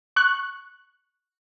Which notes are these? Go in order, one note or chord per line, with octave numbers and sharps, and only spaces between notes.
C#6 F#6